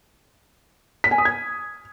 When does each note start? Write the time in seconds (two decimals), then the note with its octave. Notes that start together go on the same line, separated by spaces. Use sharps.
1.04 B6
1.11 G#5
1.18 D#6
1.25 G#6